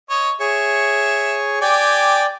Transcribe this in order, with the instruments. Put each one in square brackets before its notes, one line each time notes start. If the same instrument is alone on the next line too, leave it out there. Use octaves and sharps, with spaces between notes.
[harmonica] C#5 D#5
[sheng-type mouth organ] G#4 C#5 C#6 [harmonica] E5
[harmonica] G4 G#5 D6 [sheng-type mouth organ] D5 G5